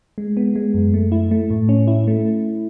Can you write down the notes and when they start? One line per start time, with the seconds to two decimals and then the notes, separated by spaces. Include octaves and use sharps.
0.18 G#3
0.37 B3
0.56 G#3
0.74 F#2
0.94 A3
1.12 E4
1.31 A3
1.50 A2
1.69 C#4
1.88 E4
2.07 A3